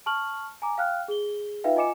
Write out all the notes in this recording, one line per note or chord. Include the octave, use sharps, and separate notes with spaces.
A5 C#6 F6 F#7
G#5 A#5 D6
F5 G5 F6 F#6
G#4 G7
D#4 F4 B4 E5 F5 G5
F4 D#5 G#5 D6 C#7 E7